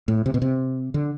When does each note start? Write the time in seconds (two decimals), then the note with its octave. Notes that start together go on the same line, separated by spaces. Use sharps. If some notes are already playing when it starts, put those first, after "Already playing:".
0.08 A2
0.26 C3
0.34 B2
0.42 C3
0.94 D3